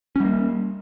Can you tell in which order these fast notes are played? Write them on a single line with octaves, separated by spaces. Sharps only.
C#4 G3 A#3